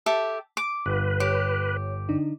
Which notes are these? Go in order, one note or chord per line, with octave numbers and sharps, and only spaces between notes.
G4 A4 E5
D6
G1 B4
G4 C#5
D3 D4 D#4